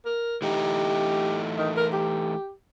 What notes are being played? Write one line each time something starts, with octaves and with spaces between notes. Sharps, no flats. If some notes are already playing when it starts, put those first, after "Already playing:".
A#4
E3 A3 D#4 G4
D#3
A#4
G4